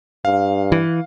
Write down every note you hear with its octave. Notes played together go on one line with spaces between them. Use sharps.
G2 F5
E3